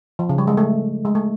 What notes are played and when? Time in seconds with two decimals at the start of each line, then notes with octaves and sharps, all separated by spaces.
0.19 F3
0.29 C#3
0.38 G3
0.47 G#3
0.57 A3
1.05 G#3
1.15 A3